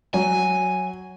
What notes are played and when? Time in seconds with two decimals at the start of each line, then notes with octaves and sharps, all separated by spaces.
0.14 F#3 G#5